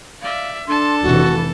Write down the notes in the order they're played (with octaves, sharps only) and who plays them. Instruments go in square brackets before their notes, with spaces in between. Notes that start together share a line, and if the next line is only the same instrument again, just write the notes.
[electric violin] D5 E5 [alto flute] F5
[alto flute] D4 [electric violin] A4 A5 [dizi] C6
[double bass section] F1 E3 [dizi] F#4